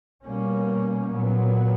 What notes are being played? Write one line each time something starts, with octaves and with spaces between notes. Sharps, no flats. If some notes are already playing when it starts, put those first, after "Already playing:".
B2 G3 A#3 C#4
A#2 F#3 B3